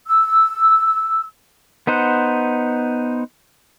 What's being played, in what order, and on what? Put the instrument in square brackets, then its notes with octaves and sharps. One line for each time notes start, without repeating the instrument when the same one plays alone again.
[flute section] E6
[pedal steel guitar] B3 D#4 C5 F#5